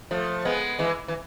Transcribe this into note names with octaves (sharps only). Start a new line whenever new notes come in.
F3 A3
G#3 B3
E3 G#3
E3